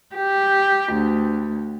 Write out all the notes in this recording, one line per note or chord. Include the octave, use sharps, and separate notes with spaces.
G4
D2